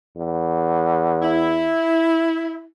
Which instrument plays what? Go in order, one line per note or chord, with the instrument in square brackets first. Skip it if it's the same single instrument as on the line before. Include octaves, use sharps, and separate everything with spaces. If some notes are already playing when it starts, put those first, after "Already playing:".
[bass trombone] E2
[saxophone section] E4